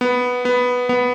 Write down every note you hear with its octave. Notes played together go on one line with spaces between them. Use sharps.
B3
B3
B3